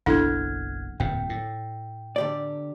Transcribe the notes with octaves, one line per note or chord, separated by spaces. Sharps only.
F#1 B1 D4 E4 A4 F#5 F6 G#6
D1 F2 A#2 G5
A2
D3 G4 D5